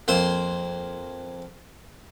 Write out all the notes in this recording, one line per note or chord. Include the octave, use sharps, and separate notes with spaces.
F2 A#3 C5 C6